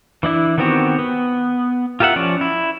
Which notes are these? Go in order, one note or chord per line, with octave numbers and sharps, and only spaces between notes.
E3 D4 E4
D#3 B3 C4 F#4 G4
B3
F4 G4 A#4 E5 F#5
F3 C#4 D5
E4